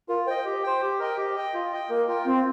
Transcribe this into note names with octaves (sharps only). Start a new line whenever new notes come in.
F4 A#4
C5 D#5 G5
G4
C5 G5
G4
A#4 D#5 G5
G4
D#5 G5
F4
D#5 G5
A#3 A#4
F4 A#4 G5
C4 F4